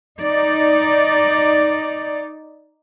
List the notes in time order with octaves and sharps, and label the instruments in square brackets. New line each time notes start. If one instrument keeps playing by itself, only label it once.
[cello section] D#4 D5